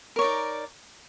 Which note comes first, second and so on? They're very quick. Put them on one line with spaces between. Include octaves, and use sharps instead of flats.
A#4 C#5 D5 D#4